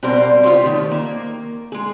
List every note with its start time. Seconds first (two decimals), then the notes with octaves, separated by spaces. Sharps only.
0.03 B2 G3 C4 A#4 C5 D5
0.43 F4 G4 G#4 A#4 C5 C#5
0.62 D#3 A3
0.91 A#3
1.72 G#3 G#4